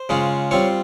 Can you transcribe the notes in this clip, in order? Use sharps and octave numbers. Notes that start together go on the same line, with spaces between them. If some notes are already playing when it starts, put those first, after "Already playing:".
Already playing: C5
C#3 G#3 C#4 F4
G3 C4 F4 C#5